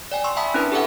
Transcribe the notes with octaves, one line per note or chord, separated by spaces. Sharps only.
D5 G5 G#5
C6 C#6 E6
E5 G5 A5 B5 D#6 B6
C#4 D4 E4 A#4 B4
G4 A4 B4 E5 F#5 G5